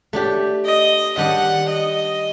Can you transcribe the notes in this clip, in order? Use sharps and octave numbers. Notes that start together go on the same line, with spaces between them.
A3 D4 G4
D#5
D#3 G3 D4 F#5
D#5